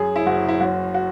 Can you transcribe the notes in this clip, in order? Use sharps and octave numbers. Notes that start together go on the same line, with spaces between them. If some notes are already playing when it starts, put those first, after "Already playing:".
Already playing: F#2 G#4
E4
F#1 F#4
E4
F#2 F#4
F#4